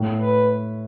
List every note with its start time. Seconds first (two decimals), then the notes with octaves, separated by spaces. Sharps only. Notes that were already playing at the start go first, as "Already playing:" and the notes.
Already playing: A2
0.20 B4